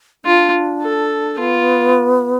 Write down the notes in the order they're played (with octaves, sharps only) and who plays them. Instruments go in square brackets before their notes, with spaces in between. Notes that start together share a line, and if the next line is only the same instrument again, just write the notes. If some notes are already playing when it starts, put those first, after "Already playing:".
[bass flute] D4 [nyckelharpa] F4
[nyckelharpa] A4
[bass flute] B3 [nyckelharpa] F4